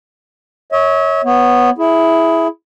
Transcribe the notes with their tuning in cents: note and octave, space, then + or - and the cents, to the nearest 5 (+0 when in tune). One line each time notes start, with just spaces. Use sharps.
C#5 +0 E5 -45
B3 -5 C#5 -20
E4 +0 G#4 +10